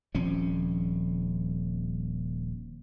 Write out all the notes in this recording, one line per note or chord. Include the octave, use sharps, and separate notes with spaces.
D#1 F3 C4 C#4